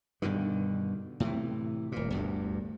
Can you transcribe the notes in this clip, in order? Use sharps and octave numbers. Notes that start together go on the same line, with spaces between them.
G2 B2 D3 D#3
A2 C3 E3
D#1 A#2
G1 D2 G2